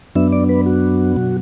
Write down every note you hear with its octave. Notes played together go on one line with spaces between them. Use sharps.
F#2 F#3 B3 D4 E5
D5
B4
F#4
B2 F#3